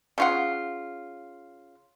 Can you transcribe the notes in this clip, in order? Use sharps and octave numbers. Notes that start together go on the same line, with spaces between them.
C#3 F4 F#5